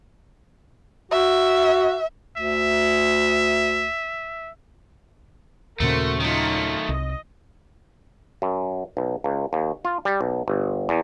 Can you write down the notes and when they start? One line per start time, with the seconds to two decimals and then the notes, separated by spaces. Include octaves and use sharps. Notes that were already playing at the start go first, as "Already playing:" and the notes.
1.12 F#4 E5
2.37 D2 E5
5.80 D#2 A#2 C#3 A3 F#4 A#4 C5
6.20 D#3 F#3 A3 D#4 F4
6.89 C2 D#5
8.42 F#2
8.97 B1
9.24 C#2
9.53 D#2
9.85 F4
10.05 G3
10.21 B1
10.48 G1
10.89 E2